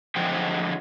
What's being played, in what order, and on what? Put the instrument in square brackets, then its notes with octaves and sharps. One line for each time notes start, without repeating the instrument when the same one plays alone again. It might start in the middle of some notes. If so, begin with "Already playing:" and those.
[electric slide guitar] D3 F3 F#3 G#3 C5 G5